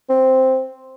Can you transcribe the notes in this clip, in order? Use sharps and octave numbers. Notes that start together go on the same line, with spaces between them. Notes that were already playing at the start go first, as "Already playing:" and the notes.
C4